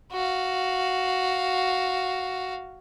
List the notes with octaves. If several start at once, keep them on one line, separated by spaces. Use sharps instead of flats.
F#4 F5